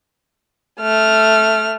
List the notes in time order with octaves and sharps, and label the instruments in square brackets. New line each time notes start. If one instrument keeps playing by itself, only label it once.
[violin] A3 F6